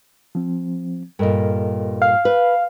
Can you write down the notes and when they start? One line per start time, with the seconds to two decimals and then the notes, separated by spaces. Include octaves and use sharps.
0.35 F3 C4
1.19 G2 A#2 A4 A#4 D#5
2.02 F5
2.25 B4